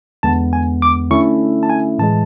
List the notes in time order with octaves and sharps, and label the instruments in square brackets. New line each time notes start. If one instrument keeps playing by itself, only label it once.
[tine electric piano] E2 D3 G#3 B3 A5
G#5
D6
D3 A3 C#4 E4 C#6
A5
G#5
A2 E3 G#3 A5